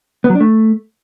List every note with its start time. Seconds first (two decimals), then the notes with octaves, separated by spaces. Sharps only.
0.24 B3
0.30 F#3
0.35 D4
0.40 A3